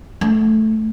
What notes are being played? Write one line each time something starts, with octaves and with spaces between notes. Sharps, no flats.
A3